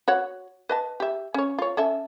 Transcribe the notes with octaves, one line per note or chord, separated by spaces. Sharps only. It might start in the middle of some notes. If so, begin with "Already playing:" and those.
F#4 C#5 F#5
B4 D#5 A5
G4 E5
C#4 C#5
F4 C#5
C#4 A4 E5